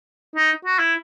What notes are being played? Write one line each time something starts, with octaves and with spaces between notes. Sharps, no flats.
D#4
F#4
E4